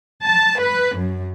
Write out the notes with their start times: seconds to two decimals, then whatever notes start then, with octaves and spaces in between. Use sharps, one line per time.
0.23 A5
0.60 B4
0.95 F#2